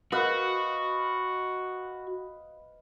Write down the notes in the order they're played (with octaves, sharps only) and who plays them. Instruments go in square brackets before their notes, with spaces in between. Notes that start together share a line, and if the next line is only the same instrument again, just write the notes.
[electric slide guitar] F#4 [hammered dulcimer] B4 D#5 F5